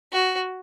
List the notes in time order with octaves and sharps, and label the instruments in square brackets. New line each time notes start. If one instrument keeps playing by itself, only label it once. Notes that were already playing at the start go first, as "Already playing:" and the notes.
[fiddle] F#4